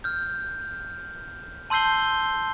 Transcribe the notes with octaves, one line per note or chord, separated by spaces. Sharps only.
F6 G6
A5 C6 E6 G6 C7 G7